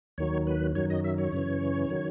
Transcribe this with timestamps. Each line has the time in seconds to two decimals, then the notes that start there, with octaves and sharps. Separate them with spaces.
0.18 D#2 D#3 F#3 C#5
0.47 B4
0.75 F#2 D#3 F#3 C#5
0.90 D#5
1.04 E5
1.18 C#5
1.32 F#2 C#3 E3
1.90 D#3 F#3